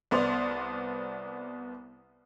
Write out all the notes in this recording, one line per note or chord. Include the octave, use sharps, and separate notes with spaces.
C2 B3 C5 D5 C6 F7